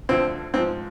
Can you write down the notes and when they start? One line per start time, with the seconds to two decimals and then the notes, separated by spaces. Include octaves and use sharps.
0.09 D2 D3 F3 C4
0.54 G#2 F3 C4